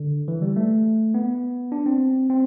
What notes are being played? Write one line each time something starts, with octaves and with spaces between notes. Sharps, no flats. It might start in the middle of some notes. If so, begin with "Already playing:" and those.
Already playing: D3
E3
G3
A3
B3
D4
C4
C4